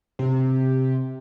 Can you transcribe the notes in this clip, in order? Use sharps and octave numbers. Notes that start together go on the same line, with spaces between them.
C3